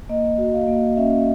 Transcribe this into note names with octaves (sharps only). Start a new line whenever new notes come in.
A#3 D#5
F#4
F5
A#3
C#4 E5